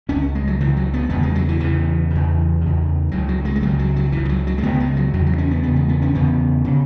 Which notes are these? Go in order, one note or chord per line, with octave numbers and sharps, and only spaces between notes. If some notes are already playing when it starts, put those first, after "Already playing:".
C#2 C#3 C#4
G#3
F#3
C#2 C#3 E3
F#3
B3
E2 C#3 B3
G#3
F#3
E3
E2 C#3 E3
E2 C#3
E2 C#3
C#2 C#3 F#3
F#3
G#3
G#3
C#2 C#3 F#3
F#3
F#3
C#2 C#3 E3
E3
F#3
F#3
G#3
C#2 C#3 B3
G#3
F#3
E2 C#3 F#3
F#3
C#4
B3
E2 C#3 B3
G#3
B3
C#4
E2 C#3 B3
C#3